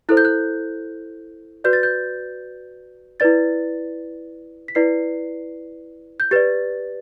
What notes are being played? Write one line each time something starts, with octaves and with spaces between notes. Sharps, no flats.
E4 A4 C5 F#6
G6
F#6
F#4 B4 D5 G6
A6
G6
E4 B4 D5 A6
B6
E4 B4 D5 C7
G6
G4 B4 D5 A6